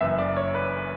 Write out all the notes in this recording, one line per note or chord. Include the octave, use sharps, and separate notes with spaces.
F#1 F#2 E3 E5
D5
C#5
B4